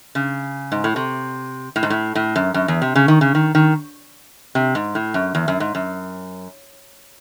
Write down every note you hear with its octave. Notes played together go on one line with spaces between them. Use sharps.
C#3
G#2
A2
C3
A2
G#2
A2
A2
F#2
F#2
E2
C3
C#3
D#3
C#3
D#3
D#3
C3
G#2
A2
F#2
E2
F#2
G#2
F#2